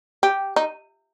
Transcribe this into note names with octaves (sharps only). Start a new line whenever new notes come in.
G4
D#4